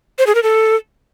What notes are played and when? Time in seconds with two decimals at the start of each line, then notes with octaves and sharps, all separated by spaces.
0.19 C5
0.27 G#4
0.35 A#4
0.43 A4